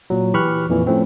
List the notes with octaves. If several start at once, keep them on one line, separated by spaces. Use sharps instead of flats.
A#2 F#3
E3 G4 B5 C#6 F6 F#6
F2 A#2 E3
A2 F3 A3 C4 C#4